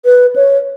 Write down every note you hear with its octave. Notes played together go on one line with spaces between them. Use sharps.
B4
C#5